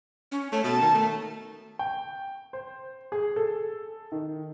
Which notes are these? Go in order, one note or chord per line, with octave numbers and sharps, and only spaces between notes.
C#4
A3 C#5
B2 A5
D#3
A3
G5
C5
G#4
A4
D#3